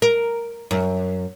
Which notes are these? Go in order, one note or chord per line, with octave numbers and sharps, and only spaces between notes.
A#4
F#2